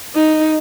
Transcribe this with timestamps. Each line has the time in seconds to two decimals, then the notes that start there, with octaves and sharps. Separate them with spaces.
0.15 D#4